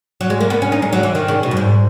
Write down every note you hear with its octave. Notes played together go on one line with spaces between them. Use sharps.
F#3
G#3
A#3
B3
C#4
D#4
G#3
F#3
E3
D#3
C#3
B2
F#2
G#2